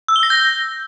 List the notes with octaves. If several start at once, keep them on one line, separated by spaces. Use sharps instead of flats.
E6
G7
A#6
G6